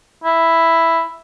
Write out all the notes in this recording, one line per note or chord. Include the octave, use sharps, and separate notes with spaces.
E4